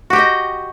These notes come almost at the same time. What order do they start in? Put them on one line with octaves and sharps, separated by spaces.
F#4 G4 G5 D#5